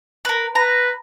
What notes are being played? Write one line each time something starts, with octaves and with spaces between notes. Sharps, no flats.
A#4 B4
B4 A#5